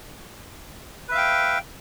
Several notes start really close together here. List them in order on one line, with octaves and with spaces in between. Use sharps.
B4 E5 F5 G5